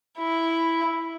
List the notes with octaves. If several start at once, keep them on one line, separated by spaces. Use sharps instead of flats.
E4